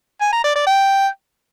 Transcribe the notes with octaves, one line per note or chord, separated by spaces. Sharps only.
G#5
A#5
D5
D5
G5